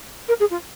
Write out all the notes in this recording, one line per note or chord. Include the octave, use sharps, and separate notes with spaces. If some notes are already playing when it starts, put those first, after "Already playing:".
A#4
G#4
F4